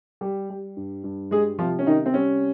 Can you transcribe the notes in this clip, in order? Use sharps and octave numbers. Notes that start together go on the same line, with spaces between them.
G3 G4
G3
G2
G2
G3 G#3 G#4
C3 F3 F4
C#4
C3 D#3 D#4
C4
G3 C#4